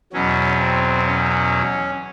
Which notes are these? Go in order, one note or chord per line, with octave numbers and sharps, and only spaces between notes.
E2 B2 F#3 C#4
C4
C#4